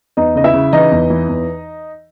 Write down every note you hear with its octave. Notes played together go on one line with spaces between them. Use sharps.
E2 D#4 D#5
C#3 D#5
E4 E5
C#3
E3 D#4 D#5
E2
E3
E2